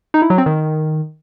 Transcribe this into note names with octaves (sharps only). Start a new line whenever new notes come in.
D#4
E4
F#3
C4
D#3